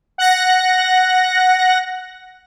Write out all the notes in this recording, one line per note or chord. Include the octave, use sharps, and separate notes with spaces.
F#5 F#6 A#6